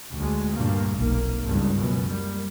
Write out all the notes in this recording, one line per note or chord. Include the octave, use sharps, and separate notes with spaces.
D2 G#3
D2 G2 A#2 A#3
F1 B1 A#3
G#1 C#2 G2
C#2 F#2 B2
G3 A#3